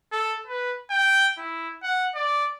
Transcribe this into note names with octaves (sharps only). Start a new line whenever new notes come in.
A4
B4
G5
E4
F#5
D5